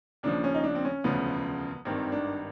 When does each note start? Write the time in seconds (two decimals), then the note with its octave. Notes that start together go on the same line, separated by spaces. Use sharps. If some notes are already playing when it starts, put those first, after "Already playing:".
0.23 D#2 C#3 F3 D4
0.44 C#4
0.54 D#4
0.64 D4
0.75 C4
0.85 C#4
1.04 E1 D2 C#3 F3 B3
1.85 G#1 G2 D#3 C4
2.12 D4